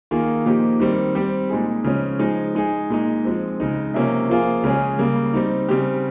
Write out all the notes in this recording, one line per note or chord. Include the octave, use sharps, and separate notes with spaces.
D#3 A#3 F4 G#4
A#2 F3 A#3 D#4 G4
D#3 G3 C4
G3 C4 G4
A#2 G#3 D#4 G#4
C#3 F3 G#3 C#4
F3 G#3 D#4 G#4
G#3 D#4 G#4
A#2 G#3 D#4
F3 G#3 C4
C#3 G#3 D#4
C3 F3 A#3 C#4
F3 A#3 F4 G#4
C#3 G#3 C#4 G#4
C#3 G3 A#3
G3 C4 D#4
C#3 G3 C4 G4